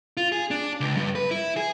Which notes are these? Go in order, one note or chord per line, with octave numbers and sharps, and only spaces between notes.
F4
G#4
D4
C#2
G2
B4
E4
G#4